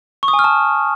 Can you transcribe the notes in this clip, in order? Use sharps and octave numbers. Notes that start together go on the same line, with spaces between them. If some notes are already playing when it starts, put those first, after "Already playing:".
C#6
D#6
G#5
F6
A5